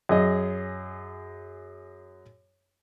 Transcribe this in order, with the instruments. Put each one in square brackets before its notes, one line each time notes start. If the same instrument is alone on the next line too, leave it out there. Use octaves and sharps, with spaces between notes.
[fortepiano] F#2 G#4 D#5